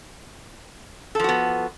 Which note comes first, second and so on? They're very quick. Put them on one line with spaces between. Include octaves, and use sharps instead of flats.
A4 F3 F#4 B3